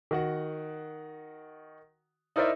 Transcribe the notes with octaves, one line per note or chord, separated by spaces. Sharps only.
D#3 F#4 F#5
D#4 E4 A#4 C5 D5 E5